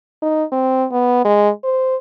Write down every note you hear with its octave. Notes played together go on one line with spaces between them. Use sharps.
D#4
C4
B3
G#3
C5